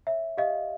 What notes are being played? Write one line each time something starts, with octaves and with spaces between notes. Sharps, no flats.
C#5 E5
G4 D#5 F5